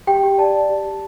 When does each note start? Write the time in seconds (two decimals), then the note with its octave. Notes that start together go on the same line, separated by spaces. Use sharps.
0.07 G4 G5
0.23 G4
0.38 D5 A5
0.54 D5
0.69 G4
0.85 G4